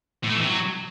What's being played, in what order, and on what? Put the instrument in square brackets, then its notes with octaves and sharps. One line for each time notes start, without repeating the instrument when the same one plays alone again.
[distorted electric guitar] A2
A3
E3
C3
F#3